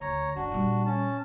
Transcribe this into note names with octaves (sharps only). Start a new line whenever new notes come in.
D2 C#5 A#5
F#1 D3 D4 F#4
A#2 G3
C#4 A5